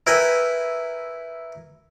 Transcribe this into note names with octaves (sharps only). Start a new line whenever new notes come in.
E4 A#4 B4 G5 G#5